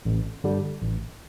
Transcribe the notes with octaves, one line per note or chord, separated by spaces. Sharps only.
A1
G2 D3 G3
A1